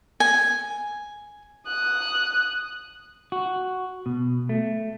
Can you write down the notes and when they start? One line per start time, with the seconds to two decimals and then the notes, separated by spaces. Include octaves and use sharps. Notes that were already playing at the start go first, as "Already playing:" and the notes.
0.20 G#5
1.67 D#6 F#6
3.32 F#4
4.06 B2
4.49 A3